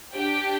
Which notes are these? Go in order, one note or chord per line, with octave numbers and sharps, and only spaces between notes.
D4 G4 G5